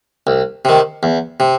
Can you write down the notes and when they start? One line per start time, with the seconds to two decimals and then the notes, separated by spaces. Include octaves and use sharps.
0.27 C2
0.65 C3 D#3
1.03 E2
1.40 C3